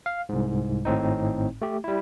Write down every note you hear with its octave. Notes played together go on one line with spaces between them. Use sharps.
F5
C2 G#2
G#1 A2 C4 D#4
A3 G4
G3 E4